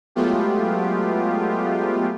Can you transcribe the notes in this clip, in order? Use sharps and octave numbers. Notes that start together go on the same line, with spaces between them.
F#3 G#3 A3 B3 F4 G4